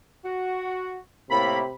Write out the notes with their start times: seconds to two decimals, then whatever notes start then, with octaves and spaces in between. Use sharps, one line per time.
0.24 F#4
1.30 A2 C3 A#3 B5